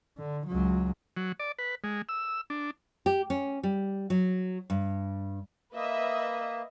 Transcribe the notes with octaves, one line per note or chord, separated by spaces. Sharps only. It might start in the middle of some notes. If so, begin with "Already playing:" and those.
D3
C#2 F#3
F#3
D5
B4
G#3
E6
D4
G4
C#4
G3
F#3
G2
A#3 B4 D#5 E5